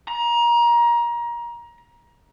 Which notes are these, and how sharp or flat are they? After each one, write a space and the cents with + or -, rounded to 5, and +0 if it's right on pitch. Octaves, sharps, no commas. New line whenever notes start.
A#5 +25